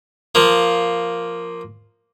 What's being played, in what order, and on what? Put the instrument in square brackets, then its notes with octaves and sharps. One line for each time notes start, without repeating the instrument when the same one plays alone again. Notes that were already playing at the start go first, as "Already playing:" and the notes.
[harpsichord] F3 A#3